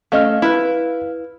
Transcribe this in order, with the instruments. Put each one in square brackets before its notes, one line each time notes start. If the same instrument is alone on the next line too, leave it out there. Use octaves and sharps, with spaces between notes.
[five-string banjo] A3 C#4 D#5 [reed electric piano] F5 F6
[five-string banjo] E4 B4